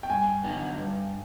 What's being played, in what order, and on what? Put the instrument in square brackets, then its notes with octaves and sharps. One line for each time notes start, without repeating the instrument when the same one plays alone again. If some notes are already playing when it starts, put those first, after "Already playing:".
[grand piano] G5
[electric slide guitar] G2 [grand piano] G#5
[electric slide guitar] D3 F#3 B3 D#4
G2